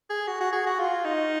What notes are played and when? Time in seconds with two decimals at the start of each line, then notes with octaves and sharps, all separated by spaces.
0.10 G#4
0.27 F#4
0.40 F#4
0.52 G#4
0.66 F#4
0.79 F4
1.05 D#4